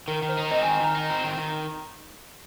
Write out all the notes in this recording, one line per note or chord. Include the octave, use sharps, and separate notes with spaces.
D#3 A#4
D#3
C5
D#4
C4 D#5
G#5
D#3
D#3 A#5
D#4
C4
D#3
D#3